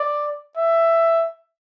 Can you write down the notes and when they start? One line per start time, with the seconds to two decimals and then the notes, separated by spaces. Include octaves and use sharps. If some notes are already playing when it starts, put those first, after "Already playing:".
Already playing: D5
0.56 E5